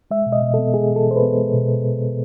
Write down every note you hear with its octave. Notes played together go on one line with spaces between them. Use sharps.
G#3 E5
B2
D#5
B2
B3 A4
G#3 G#4
B2
A4
B2 C5
B4
B3
G#3
B2